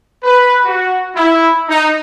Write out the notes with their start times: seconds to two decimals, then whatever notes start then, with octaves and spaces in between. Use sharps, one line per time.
0.23 B4
0.65 F#4
1.15 E4
1.69 D#4